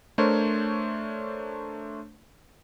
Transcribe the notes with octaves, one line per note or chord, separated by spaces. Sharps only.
A3 D4 A#4 C5 C#5